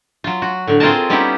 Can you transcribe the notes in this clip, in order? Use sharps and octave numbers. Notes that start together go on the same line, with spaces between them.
F#3 F4
F#4
A2 D3
C4 F4 G#4 A#4 D#5 A5
G3 B3 C#4 D#4 E4 G4